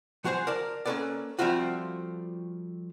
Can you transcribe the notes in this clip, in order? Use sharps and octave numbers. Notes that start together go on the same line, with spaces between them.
F3 F#4 G#4 A#4 C5
A#4 D5 A5
A#3 C#4 F#4 A4 B4 D5
F3 G3 A3 C4 F4 F#4